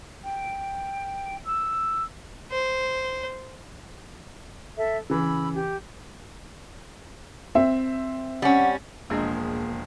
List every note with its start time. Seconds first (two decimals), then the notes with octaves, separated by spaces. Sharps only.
0.24 G5
1.45 E6
2.51 C5
4.77 A4 E5
5.10 C#3 E3 B5 E6
5.56 G4
7.55 C4 E5
8.42 G3 C#4 F#5
9.10 E1 F3 G#3 A#3 D4 G#4 D#5